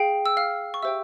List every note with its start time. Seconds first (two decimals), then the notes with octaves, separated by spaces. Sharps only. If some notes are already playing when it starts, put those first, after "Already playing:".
Already playing: G#4 C5 F5 G5
0.26 E6
0.37 F5 F6
0.74 C#6
0.82 G4 C5 E5 G5 E6